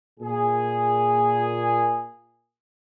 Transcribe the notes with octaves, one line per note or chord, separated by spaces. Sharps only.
A#2 G#4